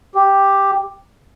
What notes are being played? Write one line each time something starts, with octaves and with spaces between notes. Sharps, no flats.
G4